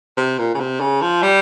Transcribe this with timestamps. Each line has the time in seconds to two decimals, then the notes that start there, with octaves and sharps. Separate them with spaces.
0.17 C3
0.39 A#2
0.55 C#3
0.60 C3
0.80 C#3
1.01 F3
1.23 G3